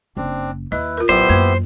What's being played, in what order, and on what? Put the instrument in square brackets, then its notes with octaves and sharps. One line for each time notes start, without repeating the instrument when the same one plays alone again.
[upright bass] F#1 [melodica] C4 D4
[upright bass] D#2 [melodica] E4 B4 [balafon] D#5
[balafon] F4 A#4
[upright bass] A1 [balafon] F#3 [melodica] B3 E4 G4 [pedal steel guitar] C5
[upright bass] F#2 E3 [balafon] A#3